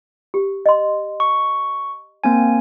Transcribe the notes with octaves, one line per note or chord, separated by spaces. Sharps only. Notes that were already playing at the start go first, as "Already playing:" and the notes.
G4
D#5 C6
C#6
A#3 C4 G#5